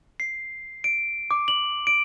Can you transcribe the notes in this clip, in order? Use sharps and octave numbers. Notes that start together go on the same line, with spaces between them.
C7
D7
D6
F#7
D7